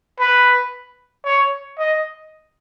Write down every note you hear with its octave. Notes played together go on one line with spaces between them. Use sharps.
B4
C#5
D#5